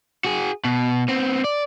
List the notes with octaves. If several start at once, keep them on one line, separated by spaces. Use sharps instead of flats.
F#4 G#4
B2
B3 C4
D5